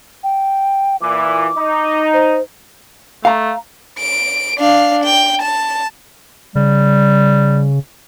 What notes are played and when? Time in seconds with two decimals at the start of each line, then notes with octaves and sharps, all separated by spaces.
0.24 G5
1.02 A#2 E3 D6
1.56 D#4
2.14 C5
3.25 A3 F5 A#5
3.99 D7
4.58 D4 F5
5.04 G5
5.42 A5
6.56 C#3 G3